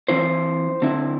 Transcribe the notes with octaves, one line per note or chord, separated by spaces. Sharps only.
E3 C4 E4 C5
D3 C4 E4